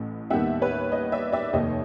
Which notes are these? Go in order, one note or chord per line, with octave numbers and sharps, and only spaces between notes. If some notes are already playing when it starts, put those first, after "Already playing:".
Already playing: A1 A2
D#2 D#3 G3 B3 E5 F#5
B4 C#5
C#5 D#5
D5 E5
D5 E5
F1 D#2 D#3 C#5 D#5